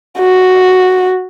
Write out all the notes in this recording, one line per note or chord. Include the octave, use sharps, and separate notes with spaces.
F#4